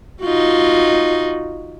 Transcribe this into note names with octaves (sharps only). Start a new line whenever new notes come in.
D#4 F4 F#4